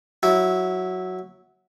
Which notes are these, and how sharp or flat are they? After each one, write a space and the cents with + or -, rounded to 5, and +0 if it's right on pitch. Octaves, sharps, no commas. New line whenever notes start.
F#3 -5 E4 -15